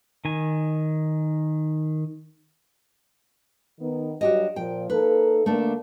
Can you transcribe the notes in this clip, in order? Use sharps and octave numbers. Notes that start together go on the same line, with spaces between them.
D#3 G#5
D#3 B3
G2 F#3 F#4 G4 D#5
A#2 F3 G5
A#3 D#4 A4 B4
D3 A3 A#3 D4